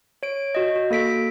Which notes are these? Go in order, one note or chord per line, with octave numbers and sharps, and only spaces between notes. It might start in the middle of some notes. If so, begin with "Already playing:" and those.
C#5 D7
F#4 D#5
F#4
A#3 A4 B6 D7